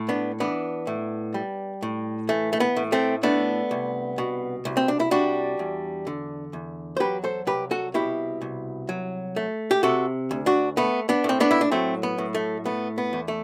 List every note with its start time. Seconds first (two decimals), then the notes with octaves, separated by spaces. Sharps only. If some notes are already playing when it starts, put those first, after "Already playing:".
Already playing: A2
0.09 B3 D4
0.40 E3 B3 D4
0.87 A2
1.34 G3
1.82 A2
2.29 E3 A3
2.53 A3
2.60 B3
2.77 A2
2.92 A3 C4
3.23 A3 B3 D4
3.71 C2
4.18 B2
4.65 C2
4.77 C4
4.88 D4
5.00 E4
5.11 G3 D4 F#4
5.59 E2
6.07 D3
6.53 E2
6.97 C5
7.00 F#3 G4 B4
7.24 A4 C5
7.47 C2 G4 B4
7.71 F#4 A4
7.94 B2 E4 G4
8.41 C2
8.89 F#3
9.36 A3
9.71 G4
9.83 C3 F#4 A4
10.31 D2
10.46 D4 F#4
10.77 A3 B3
11.09 B3 D4
11.24 A2 C4
11.40 B3 D4
11.51 E4
11.61 D4
11.72 F#3 A3 C4
12.03 B3
12.18 A2
12.35 A3
12.66 A3 B3
12.98 B3
13.13 E2
13.28 A3